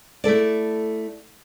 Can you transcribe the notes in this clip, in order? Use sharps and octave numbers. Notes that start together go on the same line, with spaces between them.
A3 E4 A4 D5